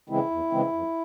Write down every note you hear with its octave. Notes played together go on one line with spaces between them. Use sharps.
C#3 E3 G#3 C4 E4
E2
C#3 E3 G#3 C4
F2